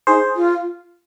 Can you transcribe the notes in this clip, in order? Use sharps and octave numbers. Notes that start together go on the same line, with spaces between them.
D#4 G#4 C5
F4